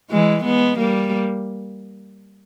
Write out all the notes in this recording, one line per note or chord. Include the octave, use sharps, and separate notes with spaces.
E3 G#3
G#3 B3
G3 A#3